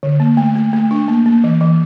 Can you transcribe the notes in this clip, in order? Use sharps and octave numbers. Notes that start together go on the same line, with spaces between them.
D3
A#3
A3
A3
A3
D4
A#3
A#3
E3
E3